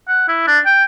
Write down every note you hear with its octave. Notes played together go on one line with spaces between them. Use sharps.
F#5
E4
D4
G5